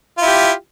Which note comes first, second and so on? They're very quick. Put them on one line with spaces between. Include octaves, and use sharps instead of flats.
F4 E4 G4